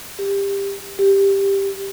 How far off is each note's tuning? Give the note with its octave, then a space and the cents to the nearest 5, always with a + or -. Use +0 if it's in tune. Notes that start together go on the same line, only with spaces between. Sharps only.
G4 +20
G4 +5